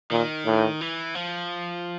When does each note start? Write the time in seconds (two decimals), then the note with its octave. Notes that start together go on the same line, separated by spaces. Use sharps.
0.11 A#2 D#3
0.46 A2
0.81 E3
1.15 F3